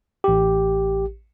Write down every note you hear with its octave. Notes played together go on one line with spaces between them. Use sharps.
A1 G4